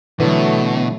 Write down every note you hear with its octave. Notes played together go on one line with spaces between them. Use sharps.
B2 D3 E3 F#3 A3 B3